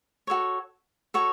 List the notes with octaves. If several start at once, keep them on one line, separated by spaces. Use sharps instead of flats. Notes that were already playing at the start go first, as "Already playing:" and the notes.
F#4 A4 C#5
F#4 A4 C#5